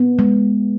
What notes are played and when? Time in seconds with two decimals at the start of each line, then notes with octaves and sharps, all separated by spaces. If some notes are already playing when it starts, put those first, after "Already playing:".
Already playing: B3
0.19 G#3